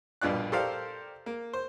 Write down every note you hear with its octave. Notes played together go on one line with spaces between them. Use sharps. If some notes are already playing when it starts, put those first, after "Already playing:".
A#1 G2 B2 F4 D5 F#6
G4 A4 A#4 C5 D5 F5
A#3
C5